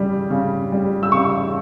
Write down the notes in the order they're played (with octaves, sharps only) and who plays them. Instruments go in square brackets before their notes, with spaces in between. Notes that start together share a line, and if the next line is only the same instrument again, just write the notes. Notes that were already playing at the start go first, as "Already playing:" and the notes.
Already playing: [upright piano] C#3 G3
C#3
G3
E6
C#3 C#6